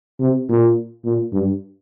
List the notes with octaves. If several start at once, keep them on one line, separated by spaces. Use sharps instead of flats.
C3
A#2
A#2
G2